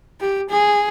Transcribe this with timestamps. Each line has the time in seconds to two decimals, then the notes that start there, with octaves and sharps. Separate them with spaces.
0.20 G4
0.49 G#4